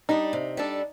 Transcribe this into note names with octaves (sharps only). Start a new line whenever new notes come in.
G3 D4 D#4
C3
G3 D4 A4